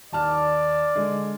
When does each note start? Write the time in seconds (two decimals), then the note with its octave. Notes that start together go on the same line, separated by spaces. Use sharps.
0.12 D#2 D5 A5 F6
0.95 D3 G#3